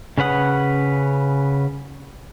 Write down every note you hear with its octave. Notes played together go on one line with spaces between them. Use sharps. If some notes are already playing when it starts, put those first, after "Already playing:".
C#3 C#4 B4 F#5 D#6